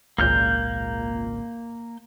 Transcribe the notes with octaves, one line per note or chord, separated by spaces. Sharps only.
G#1 C#2 A#2 A#3 F6 G6